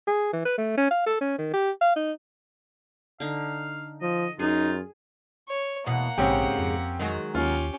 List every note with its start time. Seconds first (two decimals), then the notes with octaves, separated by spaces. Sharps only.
0.07 G#4
0.33 E3
0.46 B4
0.58 A3
0.78 C#4
0.91 F5
1.06 A4
1.21 C#4
1.38 D#3
1.53 G4
1.81 F5
1.96 D#4
3.20 D3 D#4 F5
4.01 F3 D#5
4.39 F#2 D#4 F4 G#4
5.48 C#5
5.86 E2 B2 A#3 F#5
6.18 A#1 G#2 C#3 C4 C#4 G4
6.58 F2
6.99 D#3 F#3 G#3
7.35 D#2 C#4 F4 G4